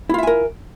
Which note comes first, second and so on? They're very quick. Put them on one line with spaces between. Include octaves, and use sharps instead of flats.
E4 F4 E5 G#5 A#4